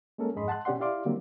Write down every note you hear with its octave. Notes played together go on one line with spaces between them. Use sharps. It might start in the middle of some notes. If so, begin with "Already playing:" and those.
G#3 A#3 C#4 A4 A#4
F2 G#2 G#4 D#5 B5 C6
F#5 A5 C6 F#6
B2 C#4 G4 D5 F#5 C6
E4 G4 D5 F5 C6 D6
D3 F#3 G3 A#3 C4